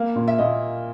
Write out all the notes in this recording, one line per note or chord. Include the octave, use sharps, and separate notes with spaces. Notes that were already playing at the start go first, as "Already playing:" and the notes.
Already playing: A#3 F5
A#2
E5
A#2 D#5